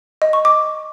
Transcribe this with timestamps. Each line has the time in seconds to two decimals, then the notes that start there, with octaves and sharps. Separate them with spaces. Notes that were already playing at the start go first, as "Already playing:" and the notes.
0.22 D#5
0.33 C#6
0.45 D6